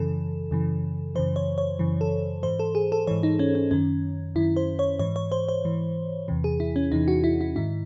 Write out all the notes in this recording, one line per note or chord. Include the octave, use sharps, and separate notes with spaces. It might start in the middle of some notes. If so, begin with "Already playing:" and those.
Already playing: F#2 C#3 E3 A4
F#2 C#3 E3
F#2 C#3 E3 C5
C#5
C#5
F#2 C#3 E3
A4
G#2 E3 C5
A4
G#4
A4
G#2 E3 C#5
D#4
C#4
C#4
F#2 D#3 C#4
F#2 D#3 E4
C5
C#5
G#2 E3 C#5
C#5
C5
C5
G#2 E3
E2 C3 E3
G#4
E4
C#4
E2 C3 E3 D#4
F#4
E4
E4
G#2 D#3 E4